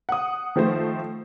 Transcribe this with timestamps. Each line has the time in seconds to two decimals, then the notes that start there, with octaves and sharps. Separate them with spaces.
0.09 F#5 D#6
0.56 D#3 F3 A3 C5